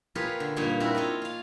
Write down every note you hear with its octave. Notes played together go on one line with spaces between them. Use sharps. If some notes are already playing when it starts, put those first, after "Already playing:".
F4 G4 G#4 A#4 B4 C#5
D3
G2 A#2 A#3 D#4 C#5 C6
C4 D4 E4 F#4 A#4
F4 C#5 D#5 G5
F4 F5